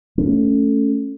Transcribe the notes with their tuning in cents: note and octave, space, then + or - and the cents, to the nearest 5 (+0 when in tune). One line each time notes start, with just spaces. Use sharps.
A3 +0 C#4 +0